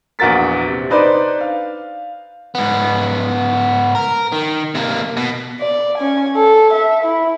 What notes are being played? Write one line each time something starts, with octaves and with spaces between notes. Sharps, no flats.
A#1 E2 F#4 A#4 A6 B6
C3
D4 D#4 B4 C5 D5
F5
G#2 B3
A#4
D#3
C3 A#3
B2
D5
C#4 G#5
A4
E5
E4